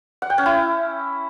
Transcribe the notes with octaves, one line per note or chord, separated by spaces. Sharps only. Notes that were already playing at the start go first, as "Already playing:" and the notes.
F#5
G5
C#4
E4